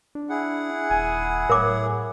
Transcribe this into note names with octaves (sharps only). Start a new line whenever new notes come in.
D4
E4 G#4 F#5
D#1 G#5
A2 A#4 C#5 D6